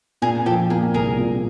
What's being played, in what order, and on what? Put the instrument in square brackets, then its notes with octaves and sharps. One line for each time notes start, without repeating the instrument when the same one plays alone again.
[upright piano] A#2 [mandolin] G#4 A#4
[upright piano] F3 [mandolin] G4 A4
[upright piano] A#3 [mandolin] G#4
[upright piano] C2 [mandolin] G#4 A#4
[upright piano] A#2